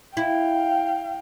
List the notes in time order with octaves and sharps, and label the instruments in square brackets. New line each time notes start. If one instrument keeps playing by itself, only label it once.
[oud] E4 [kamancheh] F5 G5